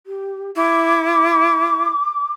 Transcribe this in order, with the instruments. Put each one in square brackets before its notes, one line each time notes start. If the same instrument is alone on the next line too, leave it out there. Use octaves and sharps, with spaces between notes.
[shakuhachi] G4
[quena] E4 [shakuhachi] D6